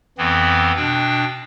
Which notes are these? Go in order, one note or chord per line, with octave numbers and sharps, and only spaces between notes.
F2 E3 B3 C4
B2 D4 G5